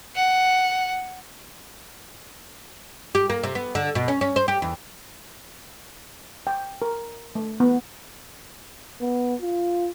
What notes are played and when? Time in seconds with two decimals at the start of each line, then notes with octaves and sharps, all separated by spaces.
0.15 F#5
3.15 G4
3.30 A#3
3.44 C3
3.55 B3
3.75 D3
3.95 B2
4.08 C#4
4.21 C#4
4.36 C5
4.48 G4
4.62 E2
6.47 G5
6.82 A#4
7.35 A3
7.60 B3
9.01 B3
9.41 F4